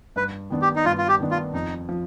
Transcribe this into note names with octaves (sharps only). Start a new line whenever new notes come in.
G2 B4
D#3 B3 D4
G4
D#4
G2 F4
F4
G4
D#3 B3 D4
F4
F2 D#4
F3